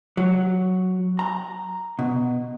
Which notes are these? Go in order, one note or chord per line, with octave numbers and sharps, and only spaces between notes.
F#3
A#5
B2